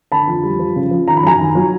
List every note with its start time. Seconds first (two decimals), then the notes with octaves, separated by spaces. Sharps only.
0.12 D3 A5 B5
0.27 F2
0.43 G3
0.59 F3
0.76 C#3
0.91 F3
1.08 D#3 A#5
1.17 B5
1.23 F#2 G#5 A#5
1.40 D#3
1.55 F#3